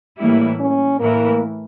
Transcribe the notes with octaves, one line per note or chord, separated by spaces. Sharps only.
A2 E3 G3 A#3 E4
C#4
A2 E3 A3 A#3 E4 A#4